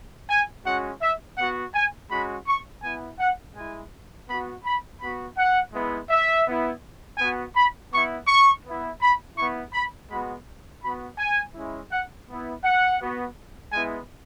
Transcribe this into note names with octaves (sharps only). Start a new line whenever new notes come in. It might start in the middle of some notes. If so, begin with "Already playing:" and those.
G#5
G#3 C#4 F#4 F#5
E5
B3 F#4 F#5
G#5
G#3 C#4 F#4 B5
C#6
B3 E4 G#5
F#5
G#3 E4 G#5
B3 F#4 B5
B5
B3 F#4 B5
F#5
G#3 B3 E4
E5
B3 E4
B3 F#4 G#5
B5
B3 E4 C#6
C#6
B3 E4
B5
B3 E4 C#6
B5
G#3 B3 F#4 B5
B3 F#4 B5
G#5
G#3 C#4 E4
F#5
B3 E4
F#5
B3 F#4
G#3 B3 E4 G#5